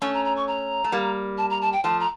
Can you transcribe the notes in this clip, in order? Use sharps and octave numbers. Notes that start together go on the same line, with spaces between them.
A3 C#4 C#6
A#5
A#5
C#6
A#5
A3
G3 A#3
A5
A#5
A5
G5
F3 A3 A5
A#5